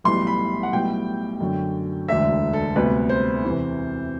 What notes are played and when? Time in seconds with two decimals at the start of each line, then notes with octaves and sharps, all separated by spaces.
0.04 B1 A2 E3 G3 B3 C6
0.27 B5
0.63 F#5
0.72 B1 A2 G3 B3 G5
1.40 F#2 D3 F#3 A3
2.08 E1 D2 D3 E5
2.53 A4
2.76 D2 C3 G3 B3 B4
3.09 C5
3.44 E2 C3 E3